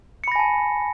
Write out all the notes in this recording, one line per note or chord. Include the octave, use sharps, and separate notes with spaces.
G#5 A5 B5 A#6 C#7